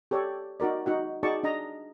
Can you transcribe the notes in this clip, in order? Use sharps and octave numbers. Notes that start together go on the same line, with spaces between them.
G4 A4 C#5 D5
D#4 F#4 A#4 D5
D#4 F#4 F#5
D#4 F#4 G#4 D5 A5 C#6
D4 D#5 A#5